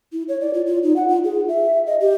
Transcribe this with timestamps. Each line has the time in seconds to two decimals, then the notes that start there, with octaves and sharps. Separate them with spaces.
0.13 E4
0.29 C#5
0.41 D5
0.54 F4
0.66 F4
0.83 D#4
0.96 F#5
1.08 F4
1.24 G#4
1.49 E5
1.87 D#5
2.01 G4